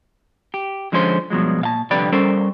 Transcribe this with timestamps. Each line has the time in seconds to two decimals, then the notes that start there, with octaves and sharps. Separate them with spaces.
0.54 G4
0.92 D3 F3 G#3 C#4 A#4 C5
1.30 G2 B2 F3 F#3 G#3
1.61 A#2 F5 A5
1.91 C2 F2 D3 G4 B4 D5
2.12 G3 C#4 A4 A#4 C5